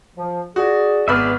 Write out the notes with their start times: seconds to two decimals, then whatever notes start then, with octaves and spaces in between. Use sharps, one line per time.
0.16 F3
0.56 F#4 G#4 D5
1.08 G#1 B3 G#4 D5 E5 B5 F6